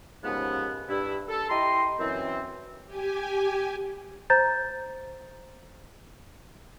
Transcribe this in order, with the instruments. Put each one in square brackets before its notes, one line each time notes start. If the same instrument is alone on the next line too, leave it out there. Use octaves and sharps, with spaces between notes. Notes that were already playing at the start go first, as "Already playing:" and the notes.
[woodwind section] D#2 G#2 C#3 F3 B3
G2 E4
A4
E4 G4 D#5 A#5 C6
F#2 E3 C4
[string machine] G4 G#5
[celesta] C5 A#5 G6 A6